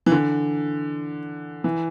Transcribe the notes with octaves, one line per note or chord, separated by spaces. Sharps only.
E3
D3
E3